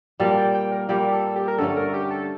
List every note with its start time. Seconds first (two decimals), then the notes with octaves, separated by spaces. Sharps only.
0.20 A#2 G3 A#3 A5
0.37 G5
0.54 G5
0.72 A#4
0.89 A#2 G3 A#3 G4
1.12 A4
1.36 G4
1.48 A#4
1.58 G2 D3 A3 C#4 A4
1.76 A#4
1.93 G4
2.11 A4